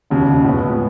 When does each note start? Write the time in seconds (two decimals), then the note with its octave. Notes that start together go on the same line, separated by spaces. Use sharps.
0.10 E1 D#2 C#3
0.44 A2 G#3 B3